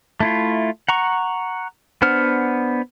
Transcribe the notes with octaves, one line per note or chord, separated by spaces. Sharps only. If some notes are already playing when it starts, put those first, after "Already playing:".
A3 E4 F4
F#5 A#5 C#6
B3 D4 C5 F#5 F6